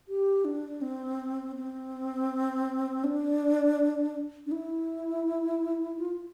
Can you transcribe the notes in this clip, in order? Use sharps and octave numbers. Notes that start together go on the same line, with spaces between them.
G4
D4
C4
C4
D4
D4
E4
F4